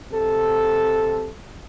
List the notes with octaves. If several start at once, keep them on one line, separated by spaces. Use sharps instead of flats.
C3 A4